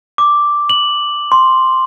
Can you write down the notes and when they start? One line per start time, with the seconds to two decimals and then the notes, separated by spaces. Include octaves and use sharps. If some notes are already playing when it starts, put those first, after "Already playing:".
0.18 D6
0.70 F#7
1.32 C6